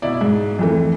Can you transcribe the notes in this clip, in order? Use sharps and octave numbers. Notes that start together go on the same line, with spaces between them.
B2 E4 D5
G#2
F2 E3 A3